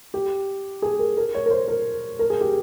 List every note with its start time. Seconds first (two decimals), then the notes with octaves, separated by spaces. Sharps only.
0.14 G4
0.82 G#4
0.99 A#4
1.17 A#4
1.34 C#5
1.46 A#4
1.51 C5
1.68 A#4
2.19 A#4
2.30 G#4
2.41 G4